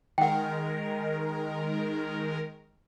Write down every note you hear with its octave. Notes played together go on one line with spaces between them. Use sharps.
D#3 G#3 A#4 F#5 G5